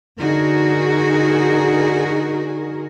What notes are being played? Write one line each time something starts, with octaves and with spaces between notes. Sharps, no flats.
D3 D#4 F#4 G#4 A#4